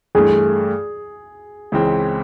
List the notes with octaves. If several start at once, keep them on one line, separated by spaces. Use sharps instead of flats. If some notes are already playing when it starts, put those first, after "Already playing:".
G2 E3 A3 G#4
C#2 C#3 E3 G#3 C4